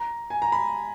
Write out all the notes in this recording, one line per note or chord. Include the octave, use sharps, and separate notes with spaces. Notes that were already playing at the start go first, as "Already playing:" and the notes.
Already playing: A#5
G#5
A#5
B5